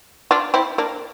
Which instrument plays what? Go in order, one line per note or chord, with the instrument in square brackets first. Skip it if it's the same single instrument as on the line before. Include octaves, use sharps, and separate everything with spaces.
[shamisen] D4 F4
C4 E4
A#3 D4